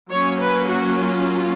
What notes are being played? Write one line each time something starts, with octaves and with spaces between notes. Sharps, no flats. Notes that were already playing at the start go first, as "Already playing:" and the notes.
F#3 A#3 C#4 C#5
B4
F#4
F4